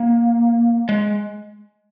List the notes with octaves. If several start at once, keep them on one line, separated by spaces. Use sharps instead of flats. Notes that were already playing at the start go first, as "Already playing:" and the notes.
Already playing: A#3
G#3